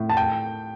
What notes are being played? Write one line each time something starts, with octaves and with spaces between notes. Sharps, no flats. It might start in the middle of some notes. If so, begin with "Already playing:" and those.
Already playing: A2
A5
G5